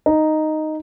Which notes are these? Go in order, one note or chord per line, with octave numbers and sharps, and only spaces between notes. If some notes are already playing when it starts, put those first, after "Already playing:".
D#4